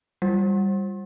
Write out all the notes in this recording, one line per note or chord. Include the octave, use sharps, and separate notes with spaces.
G3